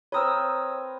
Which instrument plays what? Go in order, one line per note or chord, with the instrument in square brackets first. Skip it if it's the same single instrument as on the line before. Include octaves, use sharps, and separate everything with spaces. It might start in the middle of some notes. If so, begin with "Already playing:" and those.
[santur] C4 A#4 B4 [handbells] C#5 D#6 E6